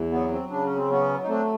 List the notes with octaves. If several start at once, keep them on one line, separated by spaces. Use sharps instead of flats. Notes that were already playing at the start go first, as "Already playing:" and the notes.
Already playing: E2
F#3 B3
C4
C#3 D4
C#4
C4
F#3 B3 C#4
D#4
A3 C4 D4